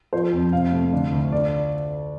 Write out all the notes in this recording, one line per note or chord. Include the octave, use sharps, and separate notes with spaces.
F3 C5
F2
C3 F5
A3
D3
D2
D3 D5